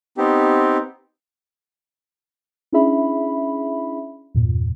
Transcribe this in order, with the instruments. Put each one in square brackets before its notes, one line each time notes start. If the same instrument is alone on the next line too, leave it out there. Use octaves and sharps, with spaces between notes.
[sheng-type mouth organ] B3 C4 D#4 G4
[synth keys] C#4 D4 E4 G#4 E5 B5
E2 G2 A#2